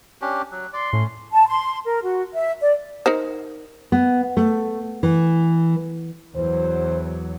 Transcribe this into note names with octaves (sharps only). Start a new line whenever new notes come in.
C#4 D4 G4
F#3 F#6
D5 C6
A2 C#4
A5
C6
A#4
F#4
E5
D5
D#4 A#4 C5
B3
A3
E3
E2 F#3 C5